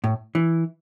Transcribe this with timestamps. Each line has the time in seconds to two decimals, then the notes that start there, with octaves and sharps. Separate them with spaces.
0.04 A2
0.35 E3